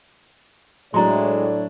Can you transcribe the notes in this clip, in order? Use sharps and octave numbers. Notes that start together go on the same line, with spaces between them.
A2 F#3 G#3 D4 D5 A#5 C6